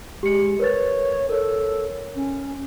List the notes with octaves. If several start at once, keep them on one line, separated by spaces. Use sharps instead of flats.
G#3 G4 C#7
A#4 B4 C#5 A6
A4 A#4 C#5
C#4